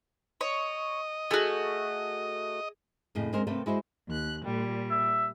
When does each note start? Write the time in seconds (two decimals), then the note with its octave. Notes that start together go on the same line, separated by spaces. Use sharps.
0.41 C#5 D#5
1.31 A3 F#4 G#4
3.15 F2 A2 C#3
3.33 D2 G#3 C4 A#4 C5
3.47 C3 A3 A#3 C4 B4
3.66 G#3 E4 F#4 C5
4.09 D#2 F#6
4.43 A#2 G3
4.91 E5